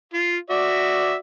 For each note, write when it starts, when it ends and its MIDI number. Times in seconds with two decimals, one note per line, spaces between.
0.14 0.37 65
0.50 1.16 66
0.50 1.16 74
0.50 1.16 76